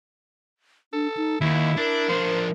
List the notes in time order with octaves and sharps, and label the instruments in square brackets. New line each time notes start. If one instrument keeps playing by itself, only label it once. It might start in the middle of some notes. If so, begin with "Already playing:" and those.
[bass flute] D4 [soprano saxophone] A4
[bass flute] D#4
[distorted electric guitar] D#2 [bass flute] D#3 [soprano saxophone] E4
[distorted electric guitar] D4 [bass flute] A#4
[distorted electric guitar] F3 D4 [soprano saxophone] C5